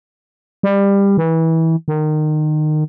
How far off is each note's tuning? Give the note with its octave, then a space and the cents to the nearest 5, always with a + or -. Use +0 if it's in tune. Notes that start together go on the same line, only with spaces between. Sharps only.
G3 +20
E3 -25
D#3 -25